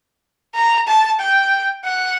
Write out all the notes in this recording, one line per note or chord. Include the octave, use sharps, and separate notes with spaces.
A#5
A5
G5
F#5